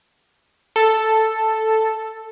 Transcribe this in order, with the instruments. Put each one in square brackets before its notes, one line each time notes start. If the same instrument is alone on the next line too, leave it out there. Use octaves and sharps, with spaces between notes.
[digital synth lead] A4